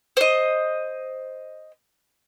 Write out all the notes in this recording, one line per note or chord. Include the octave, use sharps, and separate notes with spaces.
C5 D#5